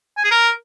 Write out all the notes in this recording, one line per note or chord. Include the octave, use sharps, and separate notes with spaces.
G#5
G#4
A#4